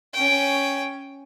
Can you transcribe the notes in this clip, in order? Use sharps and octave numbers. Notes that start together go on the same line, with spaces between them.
C#4 G5